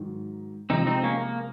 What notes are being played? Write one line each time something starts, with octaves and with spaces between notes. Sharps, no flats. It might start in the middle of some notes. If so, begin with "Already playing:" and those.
Already playing: G#2 D#3 F#3
C3 F3 G#3 C4 D#4
C4 D#4
A#3 C#4
A#3